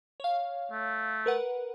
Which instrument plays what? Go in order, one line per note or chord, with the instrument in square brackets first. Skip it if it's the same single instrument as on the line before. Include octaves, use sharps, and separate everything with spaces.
[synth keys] C#5 F5
[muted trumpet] A3
[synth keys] A#4 B4 F#5